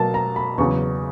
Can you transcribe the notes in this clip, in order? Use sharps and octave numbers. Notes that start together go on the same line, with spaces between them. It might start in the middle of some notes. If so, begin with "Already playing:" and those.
Already playing: B2 F#3 A#3 A5
A#5
B5
E2 C#3 F#3 C#6